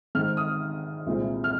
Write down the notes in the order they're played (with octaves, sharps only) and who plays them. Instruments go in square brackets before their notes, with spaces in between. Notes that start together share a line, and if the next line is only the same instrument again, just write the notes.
[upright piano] G#2 D#3 C4 F6
D#6
C2 A#2 G#3 C4
F6